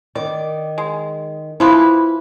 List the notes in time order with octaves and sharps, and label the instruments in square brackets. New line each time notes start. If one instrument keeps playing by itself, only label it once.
[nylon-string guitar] D#3 [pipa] D5
[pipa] G#3
[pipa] E3 F3 B4 [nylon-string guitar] E4 C5